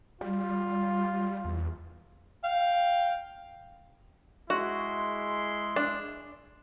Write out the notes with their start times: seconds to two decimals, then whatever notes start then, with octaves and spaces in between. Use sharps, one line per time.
0.21 G3 F4
1.45 E2
2.44 F5 G5
4.50 G#3 E4 F#4 C6
5.76 D4